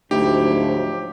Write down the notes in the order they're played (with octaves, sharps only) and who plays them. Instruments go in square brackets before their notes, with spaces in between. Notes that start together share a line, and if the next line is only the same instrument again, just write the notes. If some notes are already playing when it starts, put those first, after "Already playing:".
[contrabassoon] D2 [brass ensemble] G#2 F3 F#3 [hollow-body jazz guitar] D#4 E4 [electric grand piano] G4